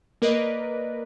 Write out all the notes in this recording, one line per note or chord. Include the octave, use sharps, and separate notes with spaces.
A#3 A#4 B4 D5 D#5